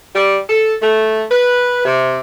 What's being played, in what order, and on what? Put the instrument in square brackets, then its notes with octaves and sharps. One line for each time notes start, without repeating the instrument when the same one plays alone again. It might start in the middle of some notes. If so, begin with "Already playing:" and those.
[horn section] G3
A4
A3
B4
C3